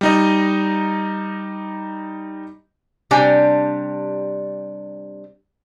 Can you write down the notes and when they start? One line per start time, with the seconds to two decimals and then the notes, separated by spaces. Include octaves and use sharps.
0.01 G3 D#4 D#5
3.11 C3 G3 D4 G4 D5 G#5